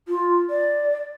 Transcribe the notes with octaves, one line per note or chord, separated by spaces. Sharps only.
F4
D5